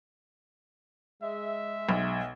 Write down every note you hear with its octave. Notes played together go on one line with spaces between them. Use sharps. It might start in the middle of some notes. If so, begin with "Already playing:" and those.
G#3 E5
B1